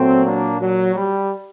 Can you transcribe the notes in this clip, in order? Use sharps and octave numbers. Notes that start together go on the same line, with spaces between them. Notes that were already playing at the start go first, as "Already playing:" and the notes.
Already playing: A#2 F#3 A3 C4
A#3 D4
F#3
G3